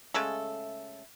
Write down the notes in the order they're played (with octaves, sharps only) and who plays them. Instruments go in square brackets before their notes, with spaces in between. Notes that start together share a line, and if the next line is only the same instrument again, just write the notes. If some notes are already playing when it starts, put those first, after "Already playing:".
[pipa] C#3 G#3 A3 A4